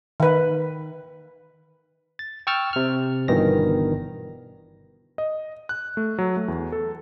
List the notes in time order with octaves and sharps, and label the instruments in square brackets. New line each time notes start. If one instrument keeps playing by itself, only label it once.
[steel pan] D#3 B4
[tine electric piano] A6
G5 C#6 E6 F6 A6
C3 F6
G1 G2 B2 D#3 E3 A#6
[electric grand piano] D#5
F#6
A3
F#3
A3
E2
A4